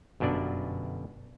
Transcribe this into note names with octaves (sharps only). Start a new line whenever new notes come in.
G1 F#2 B2 D4 D5